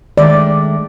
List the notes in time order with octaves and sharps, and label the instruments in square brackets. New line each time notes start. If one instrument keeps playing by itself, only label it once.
[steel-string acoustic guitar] D#3 G#3 A3 [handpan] D5